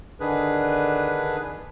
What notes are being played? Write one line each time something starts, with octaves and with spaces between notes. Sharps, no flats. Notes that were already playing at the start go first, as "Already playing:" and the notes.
D3 D#3 D4 G#4 B4